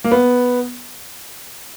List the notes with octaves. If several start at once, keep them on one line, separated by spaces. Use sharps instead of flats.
A#3
B3